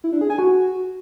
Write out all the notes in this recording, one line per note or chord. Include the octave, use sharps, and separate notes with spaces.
E4
D4
G#4
G#5
F#4